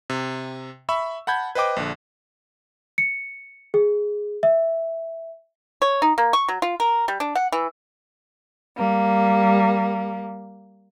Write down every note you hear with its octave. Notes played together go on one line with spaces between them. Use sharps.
C3
E5 B5 C#6 E6
F#5 A5 B5 G6 G#6
B4 C5 D#5 G5 D6
A#1 D3
C#7
G#4
E5
C#5
D#4
A#3
C#6
F#3
F4
A#4
G3
D4
F#5
E3
G3 A#3